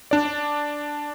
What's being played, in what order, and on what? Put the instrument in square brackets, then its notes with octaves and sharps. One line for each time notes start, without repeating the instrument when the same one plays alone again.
[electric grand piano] D4 D5